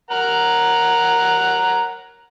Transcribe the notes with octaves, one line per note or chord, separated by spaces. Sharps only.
A#4 F#5 A#5